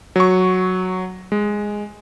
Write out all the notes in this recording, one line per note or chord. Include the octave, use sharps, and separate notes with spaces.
F#3 C#6
G#3